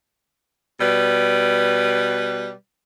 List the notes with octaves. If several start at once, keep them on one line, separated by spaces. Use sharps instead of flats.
B2 G3 B4